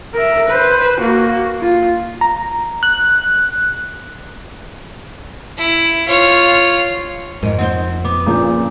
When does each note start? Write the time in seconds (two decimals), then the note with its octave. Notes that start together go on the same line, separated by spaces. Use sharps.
0.14 A#4 E5
0.47 B4 C5
1.00 A#3 F#4
1.61 F4
2.21 A#5
2.83 F#6
5.57 E4
6.08 F4 C#5
7.43 F2 G#2 A#4 D#5
7.59 C4 D#4 C5 F#5
8.05 B3 D6
8.26 A#2 C#3 F3 A#5 D6 G6